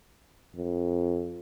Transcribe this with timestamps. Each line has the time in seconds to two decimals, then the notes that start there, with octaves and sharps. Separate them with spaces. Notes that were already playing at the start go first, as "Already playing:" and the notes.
0.56 F2